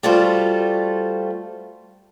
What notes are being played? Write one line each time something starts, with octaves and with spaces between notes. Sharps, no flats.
G3 A3 F4 F#4 A4 C5